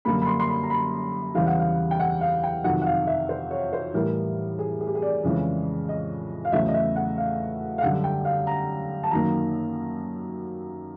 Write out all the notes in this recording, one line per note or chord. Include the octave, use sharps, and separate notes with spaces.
F#2 D3 G3 A#3 B5
B5
C6
C6
B5
A#5
B5
E2 C#3 E3 G3 F5
F#5
F5
G5
F#5
F5
G5
F2 C3 D#3 F#3 F#5
F#5
F5
E5
C5
C#5
C5
A2 E3 G3 A#4
G#4
G#4
G4
G#4
D5
F2 C#3 E3 G#3
D#5
F5
E2 C#3 F#3 A3 E5
D#5
E5
F#5
F5
F5
F#2 D3 G3 F#5
G5
F5
A#5
A5
F#2 D#3 F#3 A#3 A#5